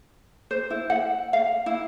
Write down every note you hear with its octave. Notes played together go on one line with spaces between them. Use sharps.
C5
E4
F#5
F5
E4